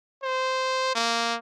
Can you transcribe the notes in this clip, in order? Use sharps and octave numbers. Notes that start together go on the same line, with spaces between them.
C5
A#3